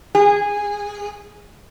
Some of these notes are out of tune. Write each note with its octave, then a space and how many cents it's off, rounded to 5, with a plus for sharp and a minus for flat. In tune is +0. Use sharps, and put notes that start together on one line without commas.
G#4 -15